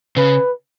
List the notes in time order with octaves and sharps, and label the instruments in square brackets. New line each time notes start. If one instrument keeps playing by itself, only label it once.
[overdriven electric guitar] C#3 [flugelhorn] B4